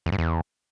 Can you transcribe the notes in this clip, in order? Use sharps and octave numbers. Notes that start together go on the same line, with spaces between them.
E2
G2
E2